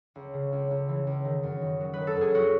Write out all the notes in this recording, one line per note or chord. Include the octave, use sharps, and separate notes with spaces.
C#2
C#3
C#2
C#2
E3
C#2
D#3
F#2
D#3
F#3
D#3 B4
A4
F#2 G#4
F#3 F#4